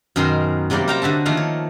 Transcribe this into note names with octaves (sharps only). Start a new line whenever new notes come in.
F#2 B2 D#3 A#4 C5 C6
C3 F#3 G3 A#3 D5 G5
A#4 C5 F5 G5 A#5
D3 F#4 E5 A5
D#3 F3 A3 A#3 F5
C#5